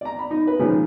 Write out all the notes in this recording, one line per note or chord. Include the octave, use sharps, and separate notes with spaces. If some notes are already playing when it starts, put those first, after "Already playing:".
D5 A#5
B5
D#4
B4
A#2 D#3 F3 G#3 C#4